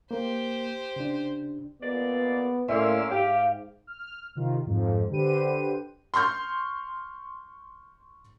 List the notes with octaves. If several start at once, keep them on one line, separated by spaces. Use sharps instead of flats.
A#3 G4 C5
C#3 D4
A#2 G#3 B3 D5
A2 A#3 C#4 D5 E5 C6 E6
G#2 G4 F5
F6
C3 D#3 F4
F2 G#2 F3
D3 G4 B4 C5 D#7
C6 C#6 F6 G6